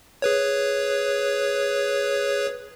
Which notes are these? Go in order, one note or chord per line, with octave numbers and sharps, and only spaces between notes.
G#4 B4 C#5